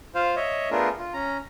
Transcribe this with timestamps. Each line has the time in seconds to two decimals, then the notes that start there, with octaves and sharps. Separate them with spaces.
0.15 F4 C5 F5
0.36 C#5 D#5 E5
0.71 A3 B3 D4 F4 G#4 A#4
0.98 F4
1.14 C#4 A#5